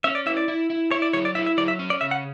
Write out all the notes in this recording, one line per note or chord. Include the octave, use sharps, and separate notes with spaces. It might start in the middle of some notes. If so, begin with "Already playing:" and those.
C#4 E5
D5
E4 E5
D5
E4
E4
E4 C#5
D5
F#3 C#5
D5
E4 E5
E5
F#3 D5
E5
C#4
D5
C#3 E5
F#5